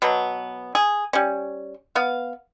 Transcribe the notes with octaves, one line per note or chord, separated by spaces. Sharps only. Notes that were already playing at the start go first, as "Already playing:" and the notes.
B2 F#3 B3
G#4
G3 C#4
B3 F5